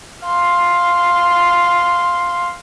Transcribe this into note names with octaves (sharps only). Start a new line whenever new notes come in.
F5 C6